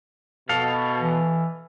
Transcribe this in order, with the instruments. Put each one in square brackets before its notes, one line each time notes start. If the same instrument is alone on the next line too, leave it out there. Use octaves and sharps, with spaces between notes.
[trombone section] B2 [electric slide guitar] A4 F5
[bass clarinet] E3